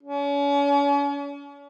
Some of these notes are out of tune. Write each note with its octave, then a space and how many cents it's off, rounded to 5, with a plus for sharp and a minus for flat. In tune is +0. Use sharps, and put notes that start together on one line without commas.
C#4 +40